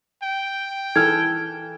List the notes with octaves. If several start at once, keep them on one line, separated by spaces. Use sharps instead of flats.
G5
E3 A4 F6 G#6